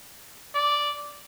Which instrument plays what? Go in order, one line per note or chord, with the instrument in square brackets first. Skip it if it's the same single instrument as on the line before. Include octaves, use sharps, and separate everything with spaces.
[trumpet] D5